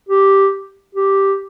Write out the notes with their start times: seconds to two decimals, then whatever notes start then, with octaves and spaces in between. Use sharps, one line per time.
0.09 G4
0.95 G4